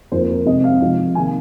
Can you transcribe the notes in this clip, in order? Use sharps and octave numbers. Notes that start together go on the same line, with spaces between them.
F2 F3 A#3 C5
A#4
C3 G#3 C4 D#5
F5
C3 F3 G#3 F5
C3 D#3 A#3 G#5